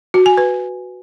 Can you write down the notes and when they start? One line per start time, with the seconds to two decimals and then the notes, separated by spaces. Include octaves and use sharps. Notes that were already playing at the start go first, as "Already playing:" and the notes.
0.14 F#4
0.26 G#5
0.37 B4